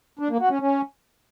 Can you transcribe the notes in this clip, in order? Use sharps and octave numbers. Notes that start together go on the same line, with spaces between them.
D4
A#3
F#4
C#4
C#4